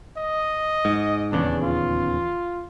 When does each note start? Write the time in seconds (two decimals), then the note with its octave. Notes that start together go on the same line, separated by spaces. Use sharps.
0.18 D#5
0.85 G#2
1.32 D#1 E2 C#3 D4
1.63 F4